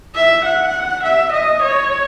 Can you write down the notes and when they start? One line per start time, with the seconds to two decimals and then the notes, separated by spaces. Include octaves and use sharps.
0.15 E5
0.45 F#5
1.04 E5
1.32 D#5
1.62 C#5